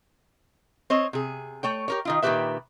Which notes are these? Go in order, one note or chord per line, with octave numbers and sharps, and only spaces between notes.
C4 C5 C#5 D#5
C3 G#4
A3 C#5 G5
G4 A#4 C#5
D#3 D#4 F4
A#2 D#3 F#4 G4 B4 E5